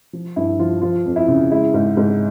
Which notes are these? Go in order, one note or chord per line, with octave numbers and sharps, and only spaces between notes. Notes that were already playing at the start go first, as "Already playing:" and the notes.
F3
G2 E4
F3 F4
F3 F4
F2
E4
C#3
G#3 E4
G#2
G#2